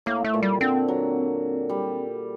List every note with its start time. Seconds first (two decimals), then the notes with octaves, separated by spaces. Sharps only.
0.06 A2 A#3
0.25 A3
0.34 A#2
0.43 G3
0.61 D3 C4
0.88 F#3
1.69 G3